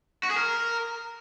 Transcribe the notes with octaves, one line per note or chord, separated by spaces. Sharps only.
F#4
G#4
A#4